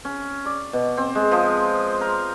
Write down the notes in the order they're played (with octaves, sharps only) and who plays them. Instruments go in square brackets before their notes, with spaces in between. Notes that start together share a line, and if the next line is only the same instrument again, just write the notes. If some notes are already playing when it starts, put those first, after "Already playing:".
[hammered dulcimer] C#4
D5
B2
C4
G#3
F3
A#4